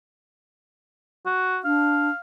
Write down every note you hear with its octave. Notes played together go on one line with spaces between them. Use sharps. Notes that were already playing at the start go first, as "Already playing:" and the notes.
F#4
D4 F5